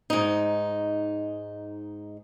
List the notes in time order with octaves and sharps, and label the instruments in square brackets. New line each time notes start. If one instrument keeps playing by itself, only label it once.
[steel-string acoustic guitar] G#2 D#4